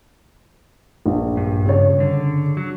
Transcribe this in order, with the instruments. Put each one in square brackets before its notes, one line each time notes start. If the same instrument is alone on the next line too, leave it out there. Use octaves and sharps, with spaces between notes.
[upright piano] A#1
[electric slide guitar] G2
[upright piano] C#3 C#5
[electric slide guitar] D3
F#3